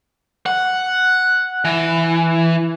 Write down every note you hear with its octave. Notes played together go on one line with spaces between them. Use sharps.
F#5
E3